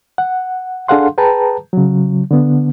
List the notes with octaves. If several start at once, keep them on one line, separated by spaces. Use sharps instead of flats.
F#5
D4 G#4 A4 F5 F#5 C6
G#4 B4 G5 A5 A#5
C#3 F#3
D3 B3